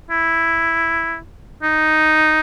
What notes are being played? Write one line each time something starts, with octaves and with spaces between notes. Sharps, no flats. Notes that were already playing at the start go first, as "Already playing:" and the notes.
E4
D#4